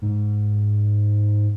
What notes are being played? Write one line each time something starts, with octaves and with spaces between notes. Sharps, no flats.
G#2